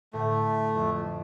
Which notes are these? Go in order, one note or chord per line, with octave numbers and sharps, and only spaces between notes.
D2 A2 A3
F2